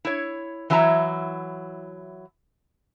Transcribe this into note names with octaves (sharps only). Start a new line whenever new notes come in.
E4 C#5
E3 F#3 E4 E5 A5 A#5